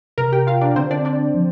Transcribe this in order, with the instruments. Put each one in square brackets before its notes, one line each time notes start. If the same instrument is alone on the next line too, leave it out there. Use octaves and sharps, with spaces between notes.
[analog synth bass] C3 [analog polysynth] A#4 A#5
[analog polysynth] G4 G5
F4 F5
D4 D5
[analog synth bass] D3 [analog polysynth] C4 C5
[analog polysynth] D4 D5
D4 D5
[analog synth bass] F3